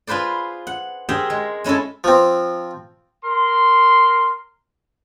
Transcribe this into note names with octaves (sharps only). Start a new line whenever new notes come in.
F4 G#4 B4 C5 D5
F#5
G4 G#4 A#4 C5 E5 G5
G#3
G#3 C#4 E4 G#4 A4
F3 C4
A#4 C6